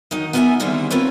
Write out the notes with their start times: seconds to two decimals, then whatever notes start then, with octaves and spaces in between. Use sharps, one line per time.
0.11 D#3 F#3 D#4
0.33 B3 D#4 A#4 C5 E5 G#5
0.60 D3 D#3 G3 G#3 A#3 C4
0.90 C4 F4 A#4 B4 C#5